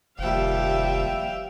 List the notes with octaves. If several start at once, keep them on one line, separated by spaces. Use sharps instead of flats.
F1 D#2 F3 G3 E5 F5 G5